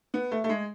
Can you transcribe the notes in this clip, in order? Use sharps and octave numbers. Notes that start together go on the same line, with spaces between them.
B3
A3
A3
G#3